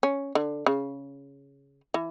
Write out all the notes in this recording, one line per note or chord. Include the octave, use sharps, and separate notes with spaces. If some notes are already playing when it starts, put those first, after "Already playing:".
C#4
D3
C#3
E3